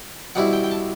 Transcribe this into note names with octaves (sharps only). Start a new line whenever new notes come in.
B2 G3 C4 E4 F#5
G5
G5
A5